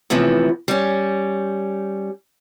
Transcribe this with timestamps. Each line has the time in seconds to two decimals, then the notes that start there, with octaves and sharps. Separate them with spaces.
0.10 A2 C3 E3 F3 B3
0.68 G3 C#4